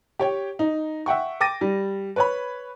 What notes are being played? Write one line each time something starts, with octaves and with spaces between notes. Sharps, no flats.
G4 C#5 G5
D#4
E5 F#5 G5 C#6
G5 D6 A6 A#6 D#7
G3
B4 C#5 B5